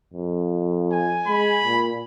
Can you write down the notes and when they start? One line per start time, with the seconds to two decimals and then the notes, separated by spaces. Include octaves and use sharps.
0.13 F2
0.92 G#5
1.27 G#3 B5
1.64 A#2